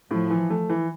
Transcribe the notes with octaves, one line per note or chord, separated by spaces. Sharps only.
A2 F3
E3
A3
E3